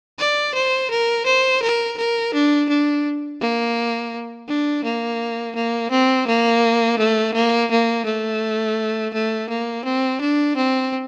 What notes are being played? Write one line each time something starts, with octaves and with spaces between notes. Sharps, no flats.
D5
C5
A#4
C5
A#4
A#4
D4
D4
A#3
D4
A#3
A#3
C4
A#3
A3
A#3
A#3
A3
A3
A#3
C4
D4
C4